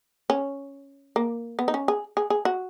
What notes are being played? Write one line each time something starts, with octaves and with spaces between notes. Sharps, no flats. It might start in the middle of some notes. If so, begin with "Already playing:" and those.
C#4
A#3
B3
D#4
C#4
G#4
G#4
G#4
F#4